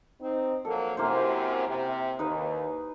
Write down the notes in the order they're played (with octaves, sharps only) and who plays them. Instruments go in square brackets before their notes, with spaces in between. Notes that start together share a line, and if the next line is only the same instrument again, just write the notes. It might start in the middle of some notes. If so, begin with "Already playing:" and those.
[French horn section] C4 D#4
[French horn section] F3 F#3 A#3 [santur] A4
[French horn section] F#2 C3 [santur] A#3 E4 C5
[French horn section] C3
[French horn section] D#2 [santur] D#4 B4